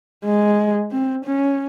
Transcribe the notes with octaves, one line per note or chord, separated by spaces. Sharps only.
G#3
C4
C#4